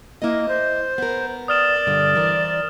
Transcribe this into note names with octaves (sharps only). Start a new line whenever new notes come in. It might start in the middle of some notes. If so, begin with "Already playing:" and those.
A#3 E4 D#5
C5
B3 A#4
D5 D#6 F6 E7
G2 B2 D3
E3 A#4 C5